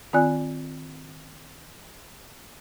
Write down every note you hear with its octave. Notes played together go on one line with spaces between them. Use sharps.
D#3 C4 F4 D5 G#5 F#6